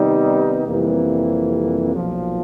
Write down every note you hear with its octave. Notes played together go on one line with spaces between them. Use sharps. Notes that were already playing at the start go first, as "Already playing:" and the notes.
Already playing: C3 D#3 G3 B3 D#4
F2 C3 E3 G3 A#3
B1 A#2 F3